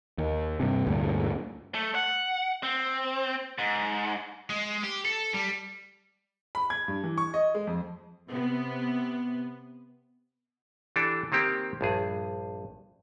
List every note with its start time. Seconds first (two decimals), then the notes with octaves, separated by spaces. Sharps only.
0.18 D#2
0.60 G2 C3
0.87 D2 G2 A#2
1.74 A3
1.95 F#5
2.63 C4
3.58 G#2
4.50 G#3
4.83 G4
5.05 A4
5.34 G3
6.55 B5
6.70 G#6
6.88 G2
7.04 E3
7.18 C#6
7.34 D#5
7.55 G#3
7.67 F2
8.30 C3 B3
10.96 E3 D4 G4 A4
11.32 D#3 A#3 C4 G4
11.81 A#1 G2 G#4